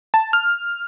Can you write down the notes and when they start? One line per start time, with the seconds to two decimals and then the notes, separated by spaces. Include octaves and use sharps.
0.14 A5
0.33 F6